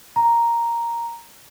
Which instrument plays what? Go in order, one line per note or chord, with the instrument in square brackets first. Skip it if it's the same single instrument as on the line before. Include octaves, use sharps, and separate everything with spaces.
[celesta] A#5